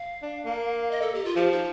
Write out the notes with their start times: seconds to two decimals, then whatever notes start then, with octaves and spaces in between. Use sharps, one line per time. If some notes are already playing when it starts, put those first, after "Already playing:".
Already playing: F5
0.23 D4
0.46 A#3
0.91 D#5
1.01 A4
1.14 G4
1.25 F4
1.36 F3 G4
1.52 D#4